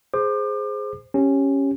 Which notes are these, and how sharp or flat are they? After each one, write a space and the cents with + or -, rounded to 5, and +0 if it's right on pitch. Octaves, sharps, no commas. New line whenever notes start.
G#4 +5 C5 +0 D6 +35
C#4 -10 G4 +0